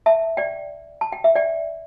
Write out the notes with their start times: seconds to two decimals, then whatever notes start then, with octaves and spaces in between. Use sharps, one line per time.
0.06 E5 A5
0.37 D5 G5
1.01 A5
1.12 G5
1.24 E5
1.35 D5 G5